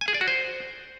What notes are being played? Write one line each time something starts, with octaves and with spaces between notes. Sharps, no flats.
G#5
G#4
D5
F#4
C5